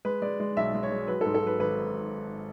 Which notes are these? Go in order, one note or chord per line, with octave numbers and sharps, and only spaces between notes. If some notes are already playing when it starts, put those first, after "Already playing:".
G#3 B4
G#3 D5
G#3
B1 E5
G#3
C#5
G#3
F#3 B4
A4
G#2
A4
F#3 B4
G#1 B4